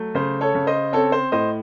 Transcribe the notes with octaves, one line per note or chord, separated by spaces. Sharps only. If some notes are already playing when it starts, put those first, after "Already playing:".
Already playing: F#3 A3
C#3 C5
A4 C#5
C#3
C5 D#5
C4 A4 C#5
C5
A2 C5 D#5